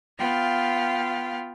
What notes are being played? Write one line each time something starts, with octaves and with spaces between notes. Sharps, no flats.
B3 F4 F5 G5